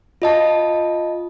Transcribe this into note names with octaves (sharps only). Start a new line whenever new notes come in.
F4 D#5 A5